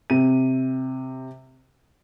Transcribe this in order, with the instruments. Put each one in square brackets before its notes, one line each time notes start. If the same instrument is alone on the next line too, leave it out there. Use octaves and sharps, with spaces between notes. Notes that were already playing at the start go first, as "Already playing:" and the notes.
[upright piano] C3 D#7